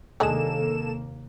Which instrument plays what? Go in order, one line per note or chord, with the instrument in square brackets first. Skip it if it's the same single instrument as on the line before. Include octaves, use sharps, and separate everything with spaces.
[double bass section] D#2 C3 A#3 [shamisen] G#3 D4 G#4 [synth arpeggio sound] A4 E7